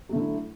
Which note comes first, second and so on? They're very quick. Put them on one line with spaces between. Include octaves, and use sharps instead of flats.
F#3 A3 D3 E4